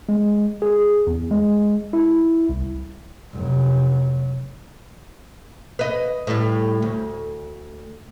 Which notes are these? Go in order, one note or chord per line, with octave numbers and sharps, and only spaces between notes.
G#3
G#4
E2
G#3
E4
C2
F1 F#3
B4 D#5
A2 G3
D2